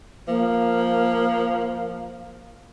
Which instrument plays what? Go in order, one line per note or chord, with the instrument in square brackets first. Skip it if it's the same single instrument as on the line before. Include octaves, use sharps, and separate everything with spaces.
[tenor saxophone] F3 [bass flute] A#3